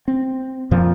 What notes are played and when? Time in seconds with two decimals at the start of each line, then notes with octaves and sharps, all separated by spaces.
0.08 C4
0.71 F2 A#2 F3